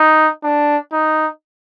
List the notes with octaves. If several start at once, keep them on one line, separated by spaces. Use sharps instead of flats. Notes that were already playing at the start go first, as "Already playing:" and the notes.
Already playing: D#4
D4
D#4